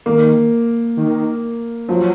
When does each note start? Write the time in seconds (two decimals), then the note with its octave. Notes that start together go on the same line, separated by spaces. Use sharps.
0.06 D#3 A#3
0.97 D#3
1.88 F3 F#3